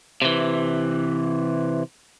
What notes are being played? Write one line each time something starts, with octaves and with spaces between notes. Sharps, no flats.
C3 E3